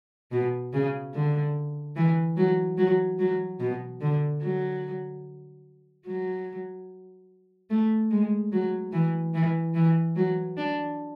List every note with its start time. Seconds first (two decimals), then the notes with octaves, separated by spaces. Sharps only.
0.32 B2
0.73 C#3
1.14 D3
1.96 E3
2.37 F#3
2.77 F#3
3.19 F#3
3.60 B2
4.01 D3
4.42 F#3
6.06 F#3
7.70 A3
8.11 G#3
8.52 F#3
8.92 E3
9.34 E3
9.74 E3
10.16 F#3
10.57 D4